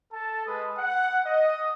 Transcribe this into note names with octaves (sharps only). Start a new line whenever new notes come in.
A4 A5
G#3 B4 D#6
F#5
D#5